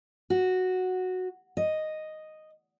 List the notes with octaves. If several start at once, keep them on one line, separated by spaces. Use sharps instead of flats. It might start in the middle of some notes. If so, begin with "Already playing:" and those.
F#4
D#5